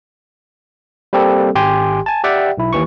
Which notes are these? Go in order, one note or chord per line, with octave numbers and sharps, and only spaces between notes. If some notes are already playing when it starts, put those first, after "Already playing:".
G3 A#3 C4 G4 A4
G#1 G4 G5 G#5 C6
G#5 A5
G4 D5 E5 F#5 G5
B1 E4
D#2 E3 C#6